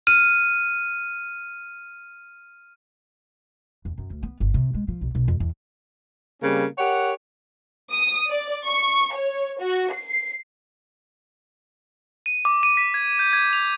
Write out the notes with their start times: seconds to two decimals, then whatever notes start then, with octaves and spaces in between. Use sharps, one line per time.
0.07 F6 D#7
3.85 E2
3.98 F#2
4.10 D2
4.23 B3
4.40 G1
4.54 C3
4.74 G#3
4.88 F3
5.01 B1
5.15 B1
5.28 F2
5.40 E2
6.43 C#3 G3 A#3 C4 C#4
6.78 G4 A#4 C#5 F#5
7.92 D#6
8.30 D5
8.66 C#6
9.14 C#5
9.59 F#4
9.92 C7
12.26 D#7
12.45 D6
12.63 D#7
12.77 B6
12.94 G#6
13.19 G6
13.33 G#6
13.53 F7